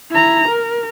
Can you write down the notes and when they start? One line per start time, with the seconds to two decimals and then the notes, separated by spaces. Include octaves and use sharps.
0.11 E4 A#5
0.49 A#4